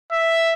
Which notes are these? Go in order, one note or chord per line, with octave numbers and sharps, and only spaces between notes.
E5